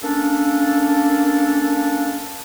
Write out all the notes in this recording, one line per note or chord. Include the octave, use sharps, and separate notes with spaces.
A#3 C#4 D4 A4